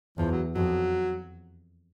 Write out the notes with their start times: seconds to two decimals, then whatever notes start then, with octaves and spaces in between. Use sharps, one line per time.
0.18 E2 F3
0.31 F#3
0.55 F2 F#3